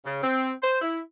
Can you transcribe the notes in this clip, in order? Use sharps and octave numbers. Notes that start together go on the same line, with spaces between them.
C#3
C4
C5
E4